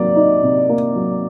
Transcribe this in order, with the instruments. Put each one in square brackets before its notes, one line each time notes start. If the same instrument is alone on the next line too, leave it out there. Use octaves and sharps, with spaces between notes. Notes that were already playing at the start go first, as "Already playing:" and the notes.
Already playing: [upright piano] C3 F#3 A#3 [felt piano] D5
[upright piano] D#4
C3
A#3
F#3